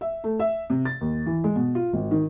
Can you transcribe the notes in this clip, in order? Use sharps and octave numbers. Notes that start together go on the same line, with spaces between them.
E5
A3
E5
C3
A6
D#2
E3
G#3
B2
F4
G#1
D#3